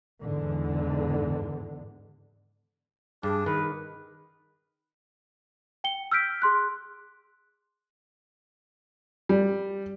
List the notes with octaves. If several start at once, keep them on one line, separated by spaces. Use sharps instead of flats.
E2 G#2 D3
G2 D4 G#4
D#3 B4
G5 C#7 G7
E6 F6 G6 B6 D7
G#4 C6 F#6
G3